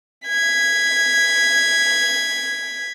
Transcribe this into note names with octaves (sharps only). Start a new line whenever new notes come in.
G#6 B6